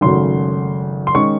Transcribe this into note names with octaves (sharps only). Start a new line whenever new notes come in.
G#1 F#2 C#3 F#3 A3 C6
C6
D#3 G#3 C#4 C#6